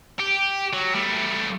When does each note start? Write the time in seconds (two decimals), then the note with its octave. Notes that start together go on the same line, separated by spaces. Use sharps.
0.19 G4
0.73 F#3
0.94 G3 A3